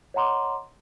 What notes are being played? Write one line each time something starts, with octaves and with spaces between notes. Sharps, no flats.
C#5 D#5 F#5 A#5 C6 D6